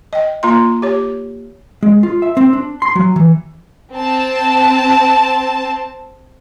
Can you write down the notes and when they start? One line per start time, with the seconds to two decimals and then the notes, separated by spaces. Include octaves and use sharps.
0.13 D#5 G5
0.43 A#3 F4 A#5 C6
0.82 G4 C#5
1.83 G#3
2.03 F4
2.22 E5
2.37 C4
2.53 D4
2.82 C6
2.95 F#3
3.16 E3
3.94 C4 A5